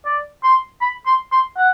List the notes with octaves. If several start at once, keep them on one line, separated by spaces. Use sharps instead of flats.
D5
C6
B5
C6
C6
F#5